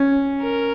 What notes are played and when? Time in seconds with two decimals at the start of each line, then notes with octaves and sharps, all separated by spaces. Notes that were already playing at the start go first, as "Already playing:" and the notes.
Already playing: C#4
0.42 A#4